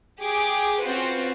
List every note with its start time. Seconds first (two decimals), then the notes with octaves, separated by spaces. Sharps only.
0.19 G4 G#4 D6
0.81 C4 C#4 F4 F#4 B4 C5